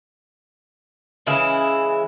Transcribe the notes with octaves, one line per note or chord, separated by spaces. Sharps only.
C#3 E3 G#3 E4